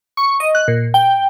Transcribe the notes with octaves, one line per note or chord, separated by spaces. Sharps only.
C#6
D#5
F#6
A#2
G5